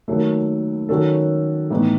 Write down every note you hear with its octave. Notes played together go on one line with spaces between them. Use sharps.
D#2 D#3 F#3 A3
D#3 F#3 C#4 F#4 A4
A2 E3 B3 D#4